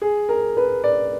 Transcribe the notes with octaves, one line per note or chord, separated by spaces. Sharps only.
G#4
A#4
B4
D5